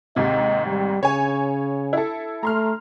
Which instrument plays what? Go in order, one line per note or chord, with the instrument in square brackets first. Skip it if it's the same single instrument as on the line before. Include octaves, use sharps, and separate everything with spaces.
[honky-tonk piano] D#2 G#2 C3 [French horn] D#5
[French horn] G3
[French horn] C#3 [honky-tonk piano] C#5 G#5
[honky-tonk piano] E4 A4
[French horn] A3 [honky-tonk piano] A#5 C6 F6